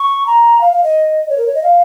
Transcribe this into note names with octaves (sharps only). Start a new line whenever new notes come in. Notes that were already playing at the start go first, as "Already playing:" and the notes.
Already playing: C#6
A#5
F5
F5
D#5
C#5
A#4
C#5
D#5
F5